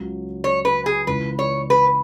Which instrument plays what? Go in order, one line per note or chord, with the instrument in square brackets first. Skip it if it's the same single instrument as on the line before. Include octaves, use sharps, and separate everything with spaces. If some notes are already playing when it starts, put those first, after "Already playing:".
Already playing: [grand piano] C#2 C#3 F#3
[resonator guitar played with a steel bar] C#5
B4
G#4
[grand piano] C#2 C#3 E3 C#4 E4 [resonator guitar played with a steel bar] B4
[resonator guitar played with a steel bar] C#5
B4